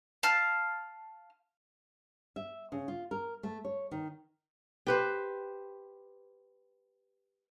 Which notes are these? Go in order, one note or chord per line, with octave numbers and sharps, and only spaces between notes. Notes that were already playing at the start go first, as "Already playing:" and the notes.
F5 A5 F6
E5
C#3
F4
A#4
A3
C#5
D#3
G4 B4 C5